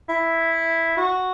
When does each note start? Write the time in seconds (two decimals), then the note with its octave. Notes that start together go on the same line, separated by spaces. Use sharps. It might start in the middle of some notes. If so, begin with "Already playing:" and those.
0.09 E4
0.97 F#4